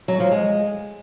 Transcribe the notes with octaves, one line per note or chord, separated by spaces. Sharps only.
F#3
F3
G#3